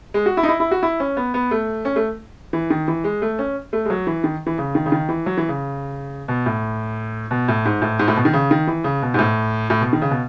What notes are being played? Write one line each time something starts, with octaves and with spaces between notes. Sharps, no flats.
G#3
F#4
E4
D#4
E4
E4
F#4
E4
C#4
B3
B3
A3
C#4
A3
E3
D#3
E3
G#3
A3
C#4
A3
G#3
F#3
E3
D#3
E3
C#3
D#3
C#3
D#3
E3
F#3
E3
C#3
B2
A2
B2
A2
G#2
A2
G#2
A2
B2
D#3
C#3
D#3
E3
C#3
B2
G#2
A2
A2
B2
D#3
C#3
B2